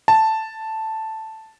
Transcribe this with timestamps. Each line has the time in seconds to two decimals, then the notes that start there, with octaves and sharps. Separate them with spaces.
0.08 A5